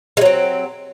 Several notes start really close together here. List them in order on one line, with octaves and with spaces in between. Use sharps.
G#3 F#3 C4